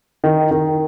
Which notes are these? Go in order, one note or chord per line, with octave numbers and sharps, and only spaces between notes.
D#3
D#3